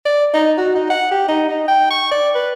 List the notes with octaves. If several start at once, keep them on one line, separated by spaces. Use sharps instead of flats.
D5
D#4
F#4
D#4
F#5
G4
D#4
D#4
G5
C#6
D5
B4